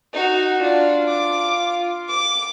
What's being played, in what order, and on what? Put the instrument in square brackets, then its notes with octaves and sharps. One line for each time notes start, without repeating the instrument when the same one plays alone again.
[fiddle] D#4 F#4
[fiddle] D4 [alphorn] F4
[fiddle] D6
D6